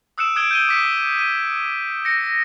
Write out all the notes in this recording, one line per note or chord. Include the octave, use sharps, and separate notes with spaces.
D#6 E6 F#6 C#7 D7 E7
D#6 F#6 G#6 D7 G7
G6 D#7 G7
D6 B6 C#7
D#7
A#6 C#7